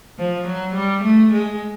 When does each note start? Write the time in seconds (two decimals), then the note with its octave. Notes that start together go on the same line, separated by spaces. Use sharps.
0.19 F3
0.47 F#3
0.75 G3
1.04 A3
1.32 G#3